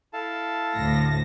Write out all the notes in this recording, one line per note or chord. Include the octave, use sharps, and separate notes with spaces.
E4 A4 F5 A5
D2 A2 A#6